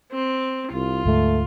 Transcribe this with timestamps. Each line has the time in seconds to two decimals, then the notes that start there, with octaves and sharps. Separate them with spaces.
0.12 C4
0.72 C2 F4
1.05 D2 G#2 A3